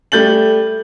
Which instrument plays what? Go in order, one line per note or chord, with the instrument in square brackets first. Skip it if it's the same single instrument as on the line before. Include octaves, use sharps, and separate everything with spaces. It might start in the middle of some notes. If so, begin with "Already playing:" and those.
[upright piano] G3 A3 G6 A6 F#7